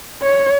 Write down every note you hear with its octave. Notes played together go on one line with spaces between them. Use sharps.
C#5